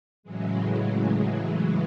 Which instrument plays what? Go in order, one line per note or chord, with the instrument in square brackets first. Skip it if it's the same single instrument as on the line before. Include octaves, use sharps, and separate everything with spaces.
[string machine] A2 C#3 E3 F#3 G#3